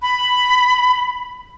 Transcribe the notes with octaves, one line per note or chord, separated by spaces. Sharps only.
B5